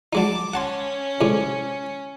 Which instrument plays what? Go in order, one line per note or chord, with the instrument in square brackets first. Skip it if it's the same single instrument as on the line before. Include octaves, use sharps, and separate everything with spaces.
[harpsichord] F#3 G#3 D#4 [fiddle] A5 D6
[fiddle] C#4 [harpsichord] F#5 A5 C6
[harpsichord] A2 C3 G#3